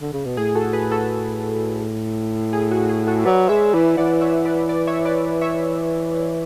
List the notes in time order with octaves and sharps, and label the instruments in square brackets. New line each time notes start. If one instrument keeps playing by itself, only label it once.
[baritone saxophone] D3
C#3
B2
[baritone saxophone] A2 [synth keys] G#4
[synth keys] F#4 A4
G#4 B4
F#4 A4
G#4
F#4
G#4
F#4 A4
[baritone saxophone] F#3 [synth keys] B4 D5
[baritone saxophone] G#3 [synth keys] C#5 E5
[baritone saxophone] E3 [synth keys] B4 D5
[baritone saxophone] E3 [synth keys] D5 F#5
[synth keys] C#5 E5
B4 D5
B4 D5
C#5 E5
C#5
B4 D5
C#5 E5